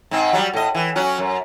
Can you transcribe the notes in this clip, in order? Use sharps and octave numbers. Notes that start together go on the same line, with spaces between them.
G#2 C4
F#3 G3
A2 D#5
E3
F#3 C#4 F#4
F#2